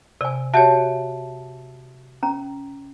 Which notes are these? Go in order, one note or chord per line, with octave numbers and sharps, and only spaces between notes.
C3 D5 G#5
F#4 G4 C#5 E5 F#5 A5
C#4 A#5